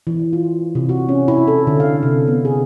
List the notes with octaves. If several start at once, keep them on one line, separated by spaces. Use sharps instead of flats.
E3
F4
C3
F#4
C#4
E4
A4
D3
F5
C3
B3
G#4